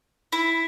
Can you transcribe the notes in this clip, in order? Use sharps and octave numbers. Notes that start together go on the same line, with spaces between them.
E4